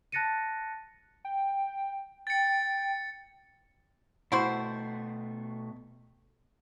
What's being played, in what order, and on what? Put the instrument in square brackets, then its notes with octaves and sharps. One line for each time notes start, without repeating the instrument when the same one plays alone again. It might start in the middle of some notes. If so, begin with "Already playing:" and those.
[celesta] A5 F#6 A6 A#6 C#7 D#7
[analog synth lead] G5
[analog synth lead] G5 [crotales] A6 C#7
[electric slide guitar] B2 A3 [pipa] E4 F#4 C5